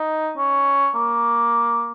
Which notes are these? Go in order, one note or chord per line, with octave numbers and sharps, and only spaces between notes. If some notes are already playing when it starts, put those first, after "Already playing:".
Already playing: D#4
C#4
A#3